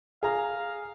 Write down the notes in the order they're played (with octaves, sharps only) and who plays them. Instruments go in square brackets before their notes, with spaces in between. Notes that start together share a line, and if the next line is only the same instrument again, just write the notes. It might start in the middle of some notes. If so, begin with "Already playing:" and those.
[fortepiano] G#4 A#5 [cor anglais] F5